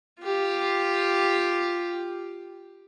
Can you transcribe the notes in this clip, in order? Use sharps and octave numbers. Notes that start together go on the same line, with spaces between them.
F4 G4